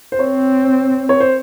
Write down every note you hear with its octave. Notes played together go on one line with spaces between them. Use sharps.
C5
C4 C#5
C#5
C5